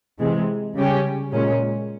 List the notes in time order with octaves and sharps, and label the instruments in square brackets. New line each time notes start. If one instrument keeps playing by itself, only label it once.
[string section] C3 E3 G#3
C#3 G3 C#4 G4
A#2 G#3 C#4